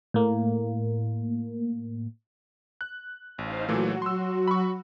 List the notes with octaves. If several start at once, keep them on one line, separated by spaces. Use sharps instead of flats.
A2 A#3
F#6
A1 D#4 C5 F5
A#2 E3 F#3 A3 F#4
C6 E6
B5 C#6